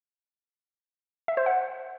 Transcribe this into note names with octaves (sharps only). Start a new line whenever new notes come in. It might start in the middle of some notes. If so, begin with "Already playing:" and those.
E5
C5
F#5